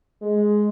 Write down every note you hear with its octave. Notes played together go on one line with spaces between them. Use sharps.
G#3